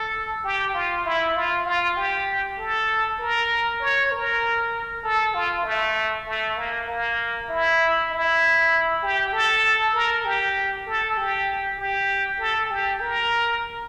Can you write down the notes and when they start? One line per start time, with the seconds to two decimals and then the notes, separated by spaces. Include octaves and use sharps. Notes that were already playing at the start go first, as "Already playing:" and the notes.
Already playing: A4
0.44 G4
0.74 F4
1.05 E4
1.36 F4
1.66 F4
1.97 G4
2.58 A4
3.19 A#4
3.81 C#5
4.11 A#4
5.03 A4
5.34 F4
5.64 A3
6.26 A3
6.57 A#3
6.88 A#3
7.49 E4
8.11 E4
9.03 G4
9.33 A4
9.94 A#4
10.25 G4
10.87 A4
11.17 G4
11.78 G4
12.39 A4
12.70 G4
13.01 A#4